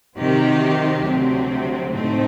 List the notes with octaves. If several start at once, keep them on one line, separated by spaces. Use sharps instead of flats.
C3 D#3 F#3 C4 G4
D2 C3 F#3 C4
A2 A3 C4 D#4